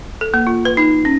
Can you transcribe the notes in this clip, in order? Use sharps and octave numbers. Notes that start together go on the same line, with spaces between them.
A4
A#3
F4
B4
D#4
C#4